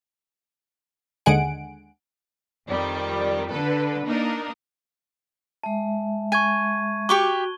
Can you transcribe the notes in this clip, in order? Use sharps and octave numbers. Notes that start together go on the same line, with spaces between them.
D#2 D3 G#3 F#5 G#5 D7
F2 D#3 G3
D3 A4 B4
A#3 D4 D#4 A#4
G#3 E5 A5
G#5 C#6 G#6 D#7
F#4 G4 C#6 D6 G7